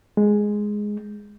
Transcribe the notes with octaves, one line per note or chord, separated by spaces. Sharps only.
G#3